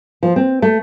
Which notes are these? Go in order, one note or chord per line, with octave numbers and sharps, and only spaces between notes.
F3
C4
A3